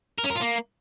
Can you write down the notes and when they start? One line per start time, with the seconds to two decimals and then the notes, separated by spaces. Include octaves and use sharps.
0.18 A#4
0.24 C#4
0.30 A#4
0.36 F4
0.41 A#3